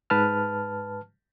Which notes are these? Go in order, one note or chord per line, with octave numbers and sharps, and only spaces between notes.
G#2 B4 A5 F6